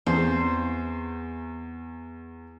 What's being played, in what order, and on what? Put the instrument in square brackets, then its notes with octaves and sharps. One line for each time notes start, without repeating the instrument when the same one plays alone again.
[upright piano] E2 [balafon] E3 C4 [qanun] C5